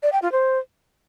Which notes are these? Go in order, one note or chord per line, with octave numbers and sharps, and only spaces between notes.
D5
G5
F4
C5